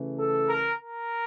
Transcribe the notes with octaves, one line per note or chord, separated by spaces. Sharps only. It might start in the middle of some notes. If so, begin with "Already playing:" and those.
Already playing: C#3 E3 A3
A4
A#4
A#4